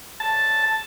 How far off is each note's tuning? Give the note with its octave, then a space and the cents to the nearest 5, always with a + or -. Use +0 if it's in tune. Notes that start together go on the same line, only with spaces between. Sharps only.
A5 +0